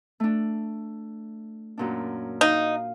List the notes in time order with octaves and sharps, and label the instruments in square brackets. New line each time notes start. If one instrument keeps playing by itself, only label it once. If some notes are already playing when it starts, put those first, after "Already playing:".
[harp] A3 D4
F#2 A#2 D4
[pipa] D#4 [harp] F5